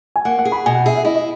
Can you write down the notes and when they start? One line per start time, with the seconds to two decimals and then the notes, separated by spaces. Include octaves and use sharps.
0.16 G#5
0.25 A#3 F#5
0.39 F#5
0.45 G#4
0.52 B5
0.66 B2 G#5
0.75 F#5
0.85 G#4 E5
0.95 E5
1.05 E4 D#5
1.15 D#5